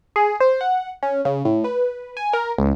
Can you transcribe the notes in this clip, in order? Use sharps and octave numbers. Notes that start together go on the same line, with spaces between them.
G#4
C5
F#5
C#4
C#3
A2
B4
G#5
A#4
C#2